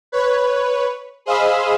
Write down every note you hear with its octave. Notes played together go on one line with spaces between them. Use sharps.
B4 C#5
G#4 C5 D#5 F5 B5 E6